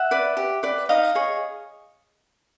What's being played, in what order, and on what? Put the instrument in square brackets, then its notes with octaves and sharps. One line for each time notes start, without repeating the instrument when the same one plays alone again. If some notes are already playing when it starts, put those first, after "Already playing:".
Already playing: [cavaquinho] E5 F#5
B4 D5
G4
B4 D5
D#4 D#5 F5
G#4 C#5